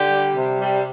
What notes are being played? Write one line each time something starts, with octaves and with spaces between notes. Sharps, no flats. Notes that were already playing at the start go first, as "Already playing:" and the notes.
Already playing: D3 G4
G3
C3
G3